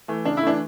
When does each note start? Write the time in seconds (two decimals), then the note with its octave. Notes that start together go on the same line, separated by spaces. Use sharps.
0.08 E3 A3
0.25 C#3 D4
0.37 E4
0.43 E3 A3 D4